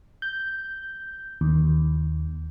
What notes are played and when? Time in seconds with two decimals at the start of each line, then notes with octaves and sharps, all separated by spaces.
0.22 G6
1.41 D#2